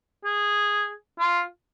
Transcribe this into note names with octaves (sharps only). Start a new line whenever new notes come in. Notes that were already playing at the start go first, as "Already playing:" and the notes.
G#4
F4